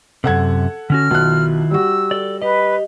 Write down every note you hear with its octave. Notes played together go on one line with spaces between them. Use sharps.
F#2 C3 A4 F#5 G#6
D3 C#4 F#4 F6
B1 D#3 E4 F4 F#6
G3 F#4 E6
A4 D5
G4 B4 D#5